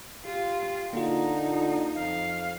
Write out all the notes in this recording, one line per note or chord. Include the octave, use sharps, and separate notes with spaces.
F4 G4
D3 A#3 D#4 F4
F2 F5